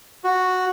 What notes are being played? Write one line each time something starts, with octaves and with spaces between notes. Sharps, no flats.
F#4